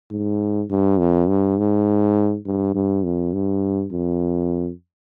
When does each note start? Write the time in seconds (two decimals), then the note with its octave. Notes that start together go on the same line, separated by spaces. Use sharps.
0.11 G#2
0.70 G2
0.99 F2
1.28 G2
1.58 G#2
2.46 G2
2.75 G2
3.04 F2
3.33 G2
3.92 F2